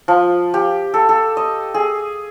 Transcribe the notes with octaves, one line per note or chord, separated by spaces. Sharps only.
F3
G4
A4
A4
D#5
G#4